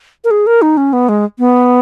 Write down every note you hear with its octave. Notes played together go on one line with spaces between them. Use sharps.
A#4
G#4
A#4
D#4
C#4
B3
G#3
B3